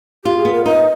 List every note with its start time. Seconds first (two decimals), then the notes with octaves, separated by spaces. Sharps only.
0.24 F4 G4
0.38 G#4
0.45 B3
0.52 A#4
0.65 D#4 D#5